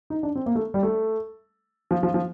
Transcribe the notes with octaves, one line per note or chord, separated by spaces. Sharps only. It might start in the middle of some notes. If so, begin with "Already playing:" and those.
D#4
D4
C4
A#3
A3
G3
A3
F3
F3
F3